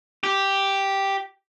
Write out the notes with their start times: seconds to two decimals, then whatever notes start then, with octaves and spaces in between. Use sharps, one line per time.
0.24 G4